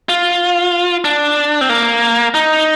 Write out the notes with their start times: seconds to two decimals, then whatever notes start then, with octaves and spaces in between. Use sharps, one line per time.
0.09 F4
1.04 D4
1.61 C4
1.69 A#3
2.34 D#4